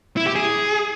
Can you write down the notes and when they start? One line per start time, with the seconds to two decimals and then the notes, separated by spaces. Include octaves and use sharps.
0.17 E4
0.26 G4
0.36 G#4